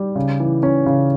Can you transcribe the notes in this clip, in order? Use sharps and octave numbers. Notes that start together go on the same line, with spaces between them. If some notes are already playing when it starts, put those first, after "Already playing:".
Already playing: G3
C#3
E3
C#4
C#3